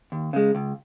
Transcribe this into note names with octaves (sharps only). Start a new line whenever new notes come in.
D#2
C#3 G#3
C#2